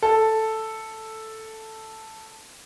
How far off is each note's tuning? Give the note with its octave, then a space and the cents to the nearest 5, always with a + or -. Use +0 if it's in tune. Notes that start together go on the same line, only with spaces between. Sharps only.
A4 +0